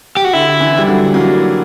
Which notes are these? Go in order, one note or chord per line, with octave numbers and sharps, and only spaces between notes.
G4
F#4
D3 E4
E3
G3
D3 F#3
F#3 A#3